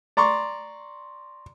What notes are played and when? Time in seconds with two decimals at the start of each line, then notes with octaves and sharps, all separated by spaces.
0.17 D5 A#5 C6 C#6